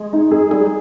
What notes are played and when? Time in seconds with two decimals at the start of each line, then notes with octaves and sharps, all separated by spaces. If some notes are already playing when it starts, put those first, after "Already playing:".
Already playing: G#3
0.13 D#4
0.31 G#4
0.51 G3 G#4